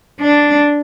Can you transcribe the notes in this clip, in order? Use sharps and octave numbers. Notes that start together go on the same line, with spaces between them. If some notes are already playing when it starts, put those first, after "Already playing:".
D4